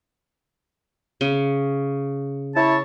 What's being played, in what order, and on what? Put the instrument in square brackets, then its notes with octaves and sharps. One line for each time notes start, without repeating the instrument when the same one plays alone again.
[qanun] C#3
[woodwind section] E4 C#5 A5